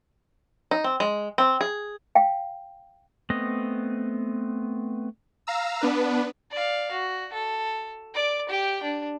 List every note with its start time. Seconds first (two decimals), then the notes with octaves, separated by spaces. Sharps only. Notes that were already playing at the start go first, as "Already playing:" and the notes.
0.71 D#4
0.84 C4
1.00 G#3
1.38 C4
1.61 G#4
2.15 F5 G5
3.30 A3 B3 C4 D#5
5.47 F5 A#5 E6
5.81 B3 D4 B4
6.51 D5 F5
6.92 F#4
7.33 A4
8.14 D5 D6
8.49 G4 G5
8.83 D4